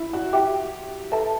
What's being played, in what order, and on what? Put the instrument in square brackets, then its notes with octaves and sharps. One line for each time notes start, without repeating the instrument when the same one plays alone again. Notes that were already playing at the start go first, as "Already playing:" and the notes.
Already playing: [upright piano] E4
F#4
[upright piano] G4 [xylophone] E5 G5 D6
[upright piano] A4 [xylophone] B4 E5 A5